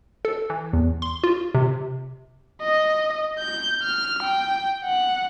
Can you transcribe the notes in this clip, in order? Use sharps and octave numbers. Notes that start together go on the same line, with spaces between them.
A4
E3
E2
C6
F4
C3
D#5
G6
F6
G5
F#5